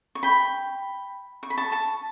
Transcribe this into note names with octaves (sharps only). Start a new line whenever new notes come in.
C#6
G5 B5
C#6
B5
A5 C#6
A5 C#6